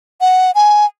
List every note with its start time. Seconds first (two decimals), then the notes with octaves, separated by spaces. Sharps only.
0.21 F#5
0.55 G#5